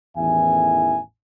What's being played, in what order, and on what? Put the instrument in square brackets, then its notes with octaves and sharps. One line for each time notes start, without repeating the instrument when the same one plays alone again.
[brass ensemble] A1 E2 D#3 E5 G#5